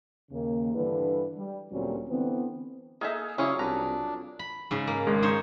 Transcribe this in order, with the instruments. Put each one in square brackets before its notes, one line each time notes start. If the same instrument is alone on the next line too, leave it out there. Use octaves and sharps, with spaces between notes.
[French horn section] D#2 C#3 A#3
G2 D3 E3 B4
G3
D2 A#2 F#3 G3 C4 C#4
D3 E3 B3 C4
[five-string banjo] A#3 D#4 E5 [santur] G#4 A4 G#5
[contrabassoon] C#3 [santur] F#3 F4 D5 [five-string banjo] C#4 G#4 C#5 [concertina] E4
[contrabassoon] C2 [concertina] D4 [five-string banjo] B4 A#5
[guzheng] B5
G#2 C#3
A#3
[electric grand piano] G#1 G#3
[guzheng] D#4 C5 C#5